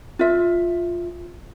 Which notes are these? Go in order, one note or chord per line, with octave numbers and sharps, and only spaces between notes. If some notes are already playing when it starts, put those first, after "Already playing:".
F4 E5